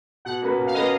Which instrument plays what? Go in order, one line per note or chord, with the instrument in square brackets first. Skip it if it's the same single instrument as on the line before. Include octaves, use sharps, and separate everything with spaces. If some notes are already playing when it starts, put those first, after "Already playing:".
[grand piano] B2 [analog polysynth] F#5
[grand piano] A#3 C#4 F#4 B4
B2
[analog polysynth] F5
[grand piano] A#3 C#4 F#4 B4 [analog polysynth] D#5